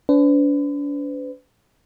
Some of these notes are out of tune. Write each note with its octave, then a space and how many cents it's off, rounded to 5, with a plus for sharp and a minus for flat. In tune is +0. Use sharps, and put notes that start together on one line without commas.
D4 -40 B4 +40